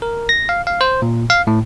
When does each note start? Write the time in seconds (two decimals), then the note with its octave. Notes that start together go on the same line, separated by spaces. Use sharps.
0.02 A#4
0.29 A#6
0.49 F5
0.67 F5
0.81 C5
1.02 A#2
1.30 F5
1.47 A2